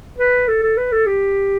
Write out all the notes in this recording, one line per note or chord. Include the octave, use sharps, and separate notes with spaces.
B4
A4
A4
B4
A4
G4